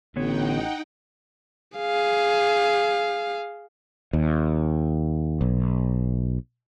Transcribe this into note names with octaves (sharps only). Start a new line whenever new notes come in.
A1 D3 B3 D#4 C#5 F#5 G5
G#4 F5
D#2
B1